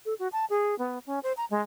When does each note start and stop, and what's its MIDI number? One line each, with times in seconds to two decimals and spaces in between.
0.05 0.14 69
0.19 0.28 66
0.32 0.45 81
0.50 0.77 68
0.79 0.99 59
1.06 1.19 61
1.23 1.33 72
1.37 1.45 82
1.50 1.62 56